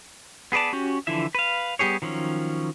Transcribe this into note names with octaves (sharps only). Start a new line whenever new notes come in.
B3 G#4 B4 D5 A5
C#4 F#4 G4
D3 E3 F3 E4 E5
B4 F5
G3 B3 G4 G#4 C#5
D#3 F3 F#3 C#4